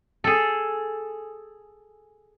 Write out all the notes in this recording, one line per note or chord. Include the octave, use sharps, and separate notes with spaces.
G#4 A4